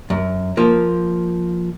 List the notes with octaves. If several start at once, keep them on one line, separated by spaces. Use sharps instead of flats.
F#2
F3 A#3